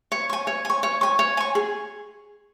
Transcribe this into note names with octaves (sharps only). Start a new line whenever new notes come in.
C#5
G#5 C#6
C#5
G#5 C#6
C#5
G#5 C#6
C#5
G#5 C#6
G#4